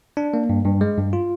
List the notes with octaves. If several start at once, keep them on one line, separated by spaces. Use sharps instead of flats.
D4
A#3
G2
G2
G#3
G2
F4